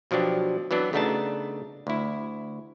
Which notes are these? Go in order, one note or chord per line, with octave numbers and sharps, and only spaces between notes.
B2 F3 F#3 D4 G4
E3 F#3 B3 D4
C#3 A3 B3 D4 D#4 A5
D2 E4